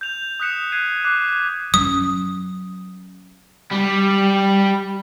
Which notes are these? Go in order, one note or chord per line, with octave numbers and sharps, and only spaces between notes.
G6 F7
D#6 F#6 B6 C#7 E7
F#6 G#6 C7 D#7
D6 F#6 C7
F#3 C#4 D#6
G3